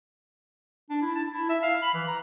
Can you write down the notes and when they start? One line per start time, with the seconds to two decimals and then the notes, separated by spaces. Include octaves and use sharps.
0.90 D4
1.02 E4
1.15 A5
1.31 E4
1.49 E5
1.63 F5
1.82 B5
1.94 E3
2.07 A#5